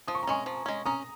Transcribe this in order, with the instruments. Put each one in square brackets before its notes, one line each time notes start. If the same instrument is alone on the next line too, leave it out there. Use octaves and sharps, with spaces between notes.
[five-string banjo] F3 [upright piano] D#6
[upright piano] C#6
A#5
[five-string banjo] G#3 C#4 [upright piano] G#5 C#6
[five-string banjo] F3
G#3 C#4
[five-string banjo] C#4 [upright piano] A#5 D#6